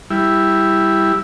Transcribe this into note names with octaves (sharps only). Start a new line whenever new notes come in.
G3 E4